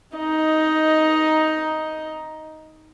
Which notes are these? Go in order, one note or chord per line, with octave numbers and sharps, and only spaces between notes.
D#4 D#5